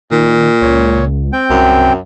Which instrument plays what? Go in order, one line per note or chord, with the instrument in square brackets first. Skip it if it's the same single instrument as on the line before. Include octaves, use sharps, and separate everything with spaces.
[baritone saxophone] A#2 [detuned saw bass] D#3
[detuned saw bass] C#2 [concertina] C#5
[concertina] C4 G5
[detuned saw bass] C2 [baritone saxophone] F#2